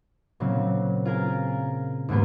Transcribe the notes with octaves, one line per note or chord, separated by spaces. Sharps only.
A#2 C#3 F#3 C4
F4 G#4 A#4
D#2 G#2 A#3 B3